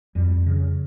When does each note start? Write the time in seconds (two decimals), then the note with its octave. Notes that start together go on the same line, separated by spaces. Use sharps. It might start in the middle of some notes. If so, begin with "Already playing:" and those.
0.15 F2 G3
0.46 C#3